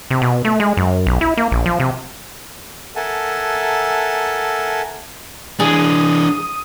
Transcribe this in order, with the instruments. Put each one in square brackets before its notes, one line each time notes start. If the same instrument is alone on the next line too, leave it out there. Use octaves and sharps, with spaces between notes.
[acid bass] C3
B2
A3
G#3
F#2
B1
E4
A#3
A#1
F3
C3
[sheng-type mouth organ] A4 A#4 E5 F#5 G#5 A5
[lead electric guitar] E3 D4 [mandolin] G#4 [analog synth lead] D#6